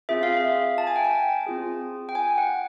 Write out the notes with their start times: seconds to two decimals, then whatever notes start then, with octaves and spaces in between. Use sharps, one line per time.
0.09 C4 F4 G#4 E5
0.23 F5
0.37 E5
0.78 A5
0.87 G#5
0.96 G5
1.04 G#5
1.46 C4 F4 G#4
2.09 G5
2.15 G#5
2.38 F#5